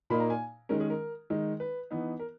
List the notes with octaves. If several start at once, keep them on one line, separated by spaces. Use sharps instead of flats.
A#2 A#3 D#4 B5
A#5
G#5
D#3 G#3 C#4 A#4
G#4
A#4
D#3 G#3 D#4
B4
E3 B3 D#4
A#4